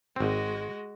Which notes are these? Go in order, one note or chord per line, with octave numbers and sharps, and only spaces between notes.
G#1 G#3 C4 F#4